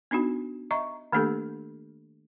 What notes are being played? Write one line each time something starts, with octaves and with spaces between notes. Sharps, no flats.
B3 D4 D#4 F#4
D#5 E5 A#5 C#6
D#3 A3 A#3 D4 G4 A4